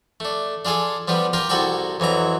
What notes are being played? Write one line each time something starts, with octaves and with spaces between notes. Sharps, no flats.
A3 D4
D4 F4 G#4 A4
F3 G3 B3 F4
F4 G4 A#4 G5
C2 F#4 A4 D5 G5 C#6
F2 E3 F#3 A#5